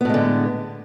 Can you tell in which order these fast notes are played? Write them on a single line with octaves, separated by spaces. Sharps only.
B3 A2 G#3 D3